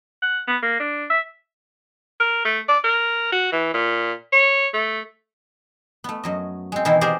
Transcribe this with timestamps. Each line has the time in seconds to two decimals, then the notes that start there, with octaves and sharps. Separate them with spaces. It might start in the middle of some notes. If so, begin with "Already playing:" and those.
0.22 F#5
0.48 B3
0.63 A#3
0.80 D4
1.10 E5
2.20 A#4
2.45 A3
2.69 D5
2.84 A#4
3.32 F#4
3.52 E3
3.74 A#2
4.32 C#5
4.74 A3
6.04 A3 B3
6.24 F#2 F#3 D#5
6.72 G#3 C4
6.85 B2 D#3 E3 C4 E4 F4
7.01 G4 G#4 A#4 C5 D5 D#5